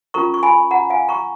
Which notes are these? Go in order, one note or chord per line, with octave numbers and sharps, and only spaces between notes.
C#4 F4 A#4 A#5 C#6
C#6
G#5 B5
F#5 A#5
F5 G#5
A#5 C#6